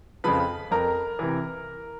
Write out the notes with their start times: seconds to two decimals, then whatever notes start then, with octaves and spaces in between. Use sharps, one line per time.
0.24 F2 C#3 F3 B4 B5
0.71 F2 A#4 A#5
1.19 C3 E3